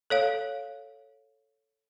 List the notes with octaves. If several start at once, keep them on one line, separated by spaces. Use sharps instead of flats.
A4 C#5 F5